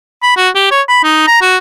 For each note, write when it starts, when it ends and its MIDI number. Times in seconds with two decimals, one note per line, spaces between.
0.23 0.34 83
0.37 0.49 66
0.55 0.69 67
0.71 0.82 73
0.88 1.00 83
1.04 1.26 63
1.27 1.41 82
1.41 1.57 66